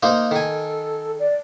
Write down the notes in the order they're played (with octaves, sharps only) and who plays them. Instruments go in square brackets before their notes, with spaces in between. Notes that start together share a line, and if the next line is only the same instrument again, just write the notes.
[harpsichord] A#3 D#4 C5
[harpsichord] D#3 G#5 [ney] A4
[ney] D5